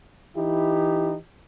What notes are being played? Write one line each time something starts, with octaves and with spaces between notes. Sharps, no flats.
E3 D#4 E4 G4